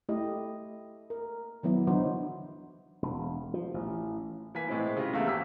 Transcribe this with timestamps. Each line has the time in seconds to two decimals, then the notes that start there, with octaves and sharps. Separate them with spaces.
0.09 A3 E4 G4 D#5
1.10 A#4
1.63 D#3 F#3 B3 E4
1.87 D3 E3 F#3 D#4 F#4 C5
3.02 E1
3.54 F3
3.74 A1
4.55 E3 A#3 G#5 B6
4.68 A2 G#3 C4 E4
4.97 C#3 F4 G4 A#6
5.13 E2 A3 A#3 A#4 E5 F5
5.26 G#1 G4 E6 B6